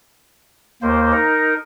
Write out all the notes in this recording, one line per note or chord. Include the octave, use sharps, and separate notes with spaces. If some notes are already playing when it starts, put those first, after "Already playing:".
D#2 A#3 C5
D#4 A#4